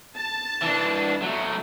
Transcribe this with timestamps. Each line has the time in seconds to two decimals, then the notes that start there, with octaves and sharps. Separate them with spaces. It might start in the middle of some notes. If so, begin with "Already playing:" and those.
0.17 A5
0.62 E3 D4
1.22 F#3 A3